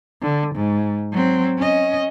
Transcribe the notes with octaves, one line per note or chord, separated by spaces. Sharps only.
D3
G#2
F#3 C4
C#4 D#5